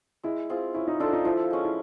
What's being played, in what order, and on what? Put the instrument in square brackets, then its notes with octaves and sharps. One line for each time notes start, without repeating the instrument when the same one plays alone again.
[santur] G#3 [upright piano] E4
[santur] C4 F4 G#4
[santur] C#4 [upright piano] E4
[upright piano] D#4
[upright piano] D4 [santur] F4 A4 C5
[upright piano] D#4
[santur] F3 [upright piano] E4
[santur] G#3 C#4
[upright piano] E4